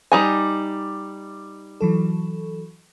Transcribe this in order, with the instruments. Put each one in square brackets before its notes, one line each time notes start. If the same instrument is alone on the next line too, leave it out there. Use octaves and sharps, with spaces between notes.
[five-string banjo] G3 D#4 G#5
[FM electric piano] E3 F#3 A4